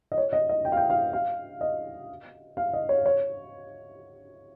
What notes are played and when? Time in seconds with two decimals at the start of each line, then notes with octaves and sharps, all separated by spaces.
0.12 D#5
0.18 C#5
0.33 D#5
0.49 D#5
0.65 G5
0.72 F5
0.77 G5
0.90 F5
1.13 F5
1.61 D#5
2.57 F5
2.73 D#5
2.89 C#5
3.06 C#5